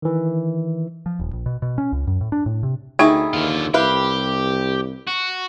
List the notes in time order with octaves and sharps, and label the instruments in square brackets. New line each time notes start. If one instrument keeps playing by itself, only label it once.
[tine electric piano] D#3 E3
[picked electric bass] F3
D#1
A#1
B2
B2
C#4
C#2
F#2
A2
D4
A2
C3
[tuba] D2 [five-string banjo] D#3 E4 G#4 [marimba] D#4 G5 G#6
[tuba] D#2 [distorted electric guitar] D3 F4
[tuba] C2 [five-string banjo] E4 B4 F5 [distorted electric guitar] G4
[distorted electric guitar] F#4